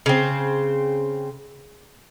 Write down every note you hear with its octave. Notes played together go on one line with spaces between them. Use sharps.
C#3 C4